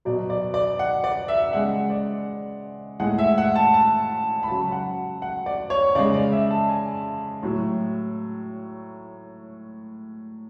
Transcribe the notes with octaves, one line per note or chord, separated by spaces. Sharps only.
B2 F#3 D5
D5
D5
F#5
D5
E5
C#3 G#3 F#5
D5
A2 G#3 F#5
E5
F#5
A5
A5
B5
C#3 F#3 A5
F#5
F#5
D5
C#5
C#3 G#3 D5
D5
E5
A5
G#5
A2 F#3